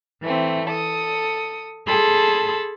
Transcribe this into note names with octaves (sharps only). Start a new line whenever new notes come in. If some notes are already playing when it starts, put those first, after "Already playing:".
E3 A3 C4
A4 D#6
G#4 A4 A5 B5 C6